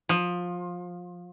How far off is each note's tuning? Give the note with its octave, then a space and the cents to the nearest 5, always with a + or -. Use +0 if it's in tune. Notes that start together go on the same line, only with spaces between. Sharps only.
F3 +20